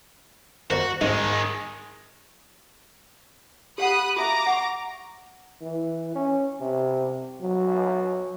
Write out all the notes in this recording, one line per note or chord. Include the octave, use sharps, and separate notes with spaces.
F#4 A#4 C5 D5
G#2 D#3 G#3 D#4
G4 F5 F#5 B5 D#6 F#6
F#4 E5 F5 A#5 D6
F#5 C#6
E3
C#4
C3
F#3